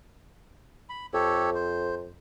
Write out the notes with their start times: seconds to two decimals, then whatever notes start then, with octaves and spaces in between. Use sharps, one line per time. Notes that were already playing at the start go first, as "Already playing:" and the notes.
0.89 B5
1.14 F2 G4 A4 C#5
1.55 C5